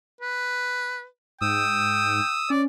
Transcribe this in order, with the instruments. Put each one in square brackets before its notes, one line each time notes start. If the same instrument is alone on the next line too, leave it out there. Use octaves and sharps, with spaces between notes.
[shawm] B4
[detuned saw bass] G#2 [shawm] G5 [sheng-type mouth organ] D#6 E6
[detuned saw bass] C#4 [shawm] D5